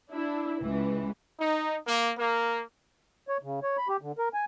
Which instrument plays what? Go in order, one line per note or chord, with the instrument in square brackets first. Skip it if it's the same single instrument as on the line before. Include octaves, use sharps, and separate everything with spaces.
[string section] D4 E4
C#2 E3
[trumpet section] D#4
A#3
A#3
[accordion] C#5
C#3
C#5
B5
G4
D3
A#4
G#5